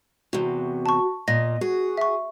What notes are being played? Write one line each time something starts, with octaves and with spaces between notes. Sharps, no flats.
E2 C3 F#4
A5 C#6
A#2 D#5 A#6
F#4 G#4
E5 C#6